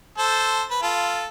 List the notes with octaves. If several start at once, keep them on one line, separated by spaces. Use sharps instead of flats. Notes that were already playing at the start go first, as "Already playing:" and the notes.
A4 C5
B4
F4 A4